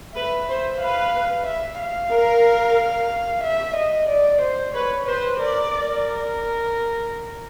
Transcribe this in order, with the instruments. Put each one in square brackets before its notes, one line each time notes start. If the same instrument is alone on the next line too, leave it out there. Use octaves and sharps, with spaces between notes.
[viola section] B4 [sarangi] E5
[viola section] C5
[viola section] B4 [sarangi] F5
[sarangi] E5
F5
[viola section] A#4
[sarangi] E5
D#5
D5
C5
[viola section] B4 [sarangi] C#5
[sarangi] B4 [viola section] C5
[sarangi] A#4 [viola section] D5
[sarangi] A#4